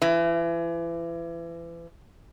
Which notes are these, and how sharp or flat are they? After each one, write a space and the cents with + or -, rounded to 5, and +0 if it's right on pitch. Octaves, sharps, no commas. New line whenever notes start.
E3 +35